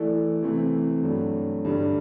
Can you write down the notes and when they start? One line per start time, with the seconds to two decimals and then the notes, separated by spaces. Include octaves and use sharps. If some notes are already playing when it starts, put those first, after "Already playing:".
Already playing: E3 A3 E4 A4 D5
0.42 C3 E3 A3 C4 E4
1.03 G2 F#3 A3
1.65 G2 D3 G3